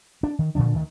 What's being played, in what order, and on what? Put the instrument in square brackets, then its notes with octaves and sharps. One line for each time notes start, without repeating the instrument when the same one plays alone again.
[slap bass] D4
D#3
A#2 D3 F3 D4
D2 D#3